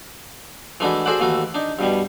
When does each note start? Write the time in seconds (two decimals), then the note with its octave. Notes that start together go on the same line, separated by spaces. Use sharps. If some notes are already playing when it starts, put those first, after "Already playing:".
0.80 E3 G#3 A3 D4 E4 F#4
1.06 F#4 G#4 A4 C5 D5 F#5
1.20 D#2 E3 A3 F#4
1.55 D4 D#4
1.79 G2 B2 G3